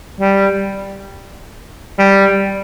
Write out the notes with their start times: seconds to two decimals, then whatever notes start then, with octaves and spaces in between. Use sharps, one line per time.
0.20 G3
1.99 G3